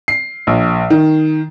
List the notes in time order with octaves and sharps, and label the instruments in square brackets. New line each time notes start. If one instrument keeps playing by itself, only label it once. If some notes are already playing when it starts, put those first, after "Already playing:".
[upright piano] C7
A#1
D#3